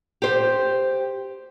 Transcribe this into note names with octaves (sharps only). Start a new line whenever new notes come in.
G4 C5